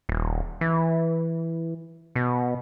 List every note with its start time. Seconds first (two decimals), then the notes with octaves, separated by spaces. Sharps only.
0.09 D#1
0.61 E3
2.15 B2